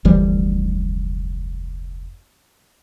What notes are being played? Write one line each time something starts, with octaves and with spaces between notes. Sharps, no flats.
F1 D2 E3 G3